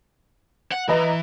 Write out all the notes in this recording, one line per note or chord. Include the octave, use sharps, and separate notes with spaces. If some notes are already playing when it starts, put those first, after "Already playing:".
F#5
E3 B4 D#5 A#5